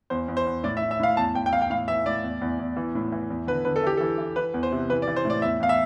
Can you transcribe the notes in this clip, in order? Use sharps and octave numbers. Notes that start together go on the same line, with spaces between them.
E2 C5
E2
C5
E2
A2 D5
E5
A2
E5
A2 F5
E2 A5
E2 G5
G5
E2 F5
G5
A2 F5
E3 E5
A2 D5
E2
E2
E2
E3
A2
E3
E2
D3 B4
D3 B4
A4
E3 G4
E3 A4
E3
E3 B4
E2
C5
C3
E3 B4
D5
E3
C5
A2 D5
E2 E5
E2 F5
E5